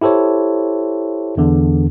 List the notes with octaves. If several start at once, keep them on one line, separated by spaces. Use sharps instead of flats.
E4 G4 A4 C5 C#5
E2 D3